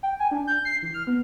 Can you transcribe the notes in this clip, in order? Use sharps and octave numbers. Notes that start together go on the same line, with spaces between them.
G5
G#5
D4
G6
C7
E3
F6
B3